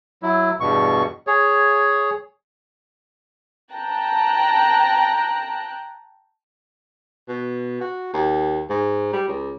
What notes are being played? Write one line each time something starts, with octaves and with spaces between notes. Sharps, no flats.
F#3 E4
E2 G2 B2 C#6
G#4 C#5
G5 A5 A#5 F#6
B2
F#4
D#2
G#2
G3
C#2